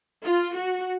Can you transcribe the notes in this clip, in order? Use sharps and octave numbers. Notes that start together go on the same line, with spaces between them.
F4
F#4